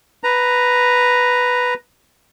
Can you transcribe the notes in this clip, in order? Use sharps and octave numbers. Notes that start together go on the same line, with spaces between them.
B4 A#5